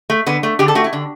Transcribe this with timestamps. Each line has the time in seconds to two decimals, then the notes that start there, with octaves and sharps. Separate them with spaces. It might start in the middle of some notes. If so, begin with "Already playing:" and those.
0.10 A3
0.26 D3 B3
0.43 A3
0.59 D3 G4
0.68 A4
0.75 A3 F#4
0.84 E4
0.93 D3